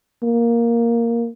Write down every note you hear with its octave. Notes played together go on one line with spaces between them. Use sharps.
A#3